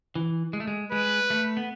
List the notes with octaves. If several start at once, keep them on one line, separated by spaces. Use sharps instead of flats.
E3
G#3
A3
G#3
G#3 B4
A3
B3